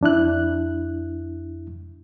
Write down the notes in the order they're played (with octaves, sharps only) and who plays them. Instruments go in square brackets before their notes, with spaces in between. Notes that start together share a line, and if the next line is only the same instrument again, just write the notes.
[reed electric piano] F2 D4 E4 F#6